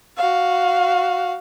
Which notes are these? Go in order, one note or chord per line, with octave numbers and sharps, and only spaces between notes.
F#4 F5